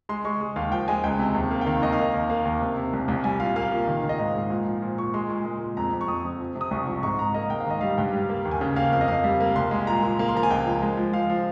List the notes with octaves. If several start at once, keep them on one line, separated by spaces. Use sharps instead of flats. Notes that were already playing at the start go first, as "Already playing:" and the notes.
G#3 C6
G#3 C#6
G#3
D#2 F5
F3 G5
G#3 G#5
C#2 G5
C3
D#2
A#3
G5
D#3 F5
D#2 D#5
F5
A#3 D#5
D#2
A#3 F5
D#2
C3
C3
C2
C2
G3 G#5
A#2 F5
A#3 F5
A#2
D#3
D#3
D#5
G#2 F5
G#2
A#2
F3
A#2
A#2 C#6
G#3 C6
A#2
G#3
A#2
F2 A#5
F2
C#6
F2 D#6
F2
F3
C3
D#6
C2 C#6
F3 C#6
G#2 C#6
G#2 A#5
A#3 D#5
G#2 G5
F5
D#3 D#5
G3 F5
G2 G5
G3
A#3
D#2
G#5
C#3 G5
A#3 F5
F2 F5
D#5
F2 F5
G3
A#3
C2 C6
G#3
A#2 A#5
A#2
A#3
C6
F3 A#5
G#5
C#2 G5
F3
G#3
F3
F3 F5
F3